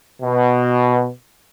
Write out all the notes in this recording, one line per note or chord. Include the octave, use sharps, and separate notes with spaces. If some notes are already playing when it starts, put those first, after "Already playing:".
B2